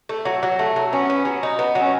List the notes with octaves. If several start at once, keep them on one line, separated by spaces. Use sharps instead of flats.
A3
F#3
F#3
A3
F#3
B3 C#4
B3
F#3
D#4
B3
F#3
C#4